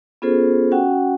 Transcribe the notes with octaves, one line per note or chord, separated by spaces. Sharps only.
B3 C#4 F4 G#4 A4 C5
C#4 F#4 F#5 G5